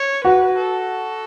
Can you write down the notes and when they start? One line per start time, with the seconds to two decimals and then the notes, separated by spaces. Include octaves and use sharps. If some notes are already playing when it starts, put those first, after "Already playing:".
Already playing: C#5
0.24 F#4 B4
0.57 A4